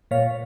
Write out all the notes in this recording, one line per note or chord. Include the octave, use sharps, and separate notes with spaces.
A#2 C#5 F5